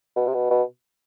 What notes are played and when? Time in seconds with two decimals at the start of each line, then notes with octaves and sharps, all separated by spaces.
0.16 B2
0.27 C3
0.34 B2
0.50 B2